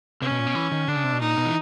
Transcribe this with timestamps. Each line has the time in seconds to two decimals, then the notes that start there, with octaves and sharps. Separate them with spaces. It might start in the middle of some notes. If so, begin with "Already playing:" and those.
0.22 C3 C#4
0.31 B2
0.39 A#2
0.47 B2
0.55 E3
0.72 D#3
0.88 D3 D4
0.96 C#3
1.04 C3
1.12 B2
1.20 A#2 D#4
1.38 B2
1.46 E3